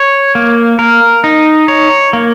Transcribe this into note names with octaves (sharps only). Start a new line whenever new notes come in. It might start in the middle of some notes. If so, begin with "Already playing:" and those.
Already playing: C#5
A#3
A#4
D#4
C#5
A#3